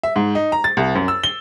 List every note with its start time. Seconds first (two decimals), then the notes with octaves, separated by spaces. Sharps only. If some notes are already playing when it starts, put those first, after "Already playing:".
0.03 E5
0.16 G#2
0.35 D#4
0.52 A#5
0.64 A6
0.77 C2
0.95 F#2
1.08 E6
1.24 G7